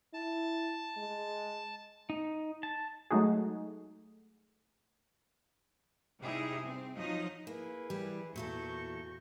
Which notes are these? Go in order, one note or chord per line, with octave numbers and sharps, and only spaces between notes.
E4 A5
G#3
D#4
A5
F#3 G#3 A3 D#4 F#4 G#4
C3 G3 D#4 E4 G4 G#4
C4
F3 F#3 D#4 D#5
A#3 E4 G#4 A#4 B4
E3 G3 G4
E2 A#2 E4 F#4 A4 C#6 G6